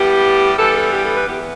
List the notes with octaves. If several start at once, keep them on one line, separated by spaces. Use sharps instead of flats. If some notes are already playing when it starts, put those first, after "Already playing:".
Already playing: A2 G3 B3 G4
G2 E3 G3 B3 A4
A4
G4
A4
B4
E2 E3 B3 G4
G4